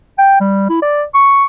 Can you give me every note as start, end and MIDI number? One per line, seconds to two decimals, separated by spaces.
0.18 0.39 79
0.40 0.67 55
0.70 0.81 64
0.82 1.03 74
1.14 1.45 85